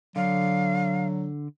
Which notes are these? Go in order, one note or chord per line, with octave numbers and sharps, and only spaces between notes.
D3 F#3 F5